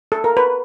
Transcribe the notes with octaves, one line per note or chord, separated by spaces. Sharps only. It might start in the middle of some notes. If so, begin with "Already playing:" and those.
A4
A#4
B4